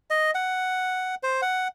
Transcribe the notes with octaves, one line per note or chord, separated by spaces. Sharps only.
D#5
F#5
C5
F#5